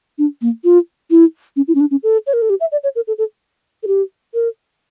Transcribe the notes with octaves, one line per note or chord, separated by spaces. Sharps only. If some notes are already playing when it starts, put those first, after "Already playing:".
D4
A#3
F4
E4
C#4
E4
C#4
D4
C#4
A4
C#5
A#4
A4
G4
E5
D5
C#5
A#4
A4
A4
A4
G4
A#4